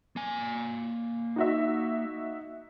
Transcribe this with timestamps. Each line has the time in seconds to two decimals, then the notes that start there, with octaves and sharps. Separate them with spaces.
0.16 A#3 G#5
1.36 D#4 F#4 E5